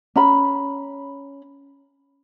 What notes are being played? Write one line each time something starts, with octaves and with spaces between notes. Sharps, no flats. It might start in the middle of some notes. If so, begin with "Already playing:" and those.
C#4 A#5 B5